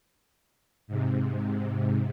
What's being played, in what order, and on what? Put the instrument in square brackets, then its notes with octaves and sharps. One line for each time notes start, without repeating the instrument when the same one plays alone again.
[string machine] G#2 C3